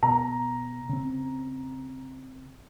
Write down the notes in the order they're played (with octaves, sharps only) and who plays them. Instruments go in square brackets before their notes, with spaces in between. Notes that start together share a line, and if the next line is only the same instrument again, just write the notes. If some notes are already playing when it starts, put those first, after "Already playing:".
[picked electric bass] B2 [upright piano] A#5
[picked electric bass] C#3 C4